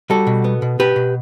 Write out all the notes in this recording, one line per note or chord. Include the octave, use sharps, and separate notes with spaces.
G3 F#4 A4
B2
B3
B2
B2 G4 B4
B2